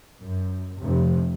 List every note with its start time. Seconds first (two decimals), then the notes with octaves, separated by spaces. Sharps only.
0.19 F#2
0.80 F1 C3